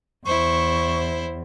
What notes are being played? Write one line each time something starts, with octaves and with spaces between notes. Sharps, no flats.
E2 E4 C5 C#6